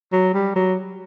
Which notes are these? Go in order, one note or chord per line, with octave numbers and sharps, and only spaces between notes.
F#3
G3
F#3